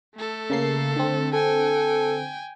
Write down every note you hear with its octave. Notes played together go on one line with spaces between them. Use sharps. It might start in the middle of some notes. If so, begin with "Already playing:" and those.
A3 A4
C#3 A#3 C7
D3 C4
A4 G5 G#5